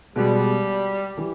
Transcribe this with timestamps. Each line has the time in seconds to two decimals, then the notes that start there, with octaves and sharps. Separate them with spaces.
0.16 B2 G3 G#3 B3
1.17 E3 G3